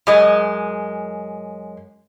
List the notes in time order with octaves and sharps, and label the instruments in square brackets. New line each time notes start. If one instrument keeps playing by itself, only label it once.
[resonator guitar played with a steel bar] F#2 G#3